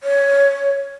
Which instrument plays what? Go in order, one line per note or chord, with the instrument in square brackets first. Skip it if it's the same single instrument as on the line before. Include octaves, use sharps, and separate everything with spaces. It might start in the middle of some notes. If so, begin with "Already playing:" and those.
[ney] C#5